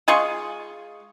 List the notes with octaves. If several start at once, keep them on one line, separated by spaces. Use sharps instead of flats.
G#3 F4 G#4 C#6